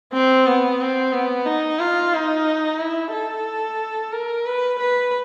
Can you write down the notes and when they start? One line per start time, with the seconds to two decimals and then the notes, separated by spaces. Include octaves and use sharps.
0.13 C4
0.46 B3
0.81 C4
1.13 B3
1.46 D#4
1.79 F4
2.14 D#4
2.79 E4
3.12 A4
4.12 A#4
4.46 B4
4.79 B4